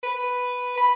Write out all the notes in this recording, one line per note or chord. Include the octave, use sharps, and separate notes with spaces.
B4
B5